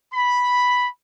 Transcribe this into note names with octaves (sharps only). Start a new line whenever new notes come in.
B5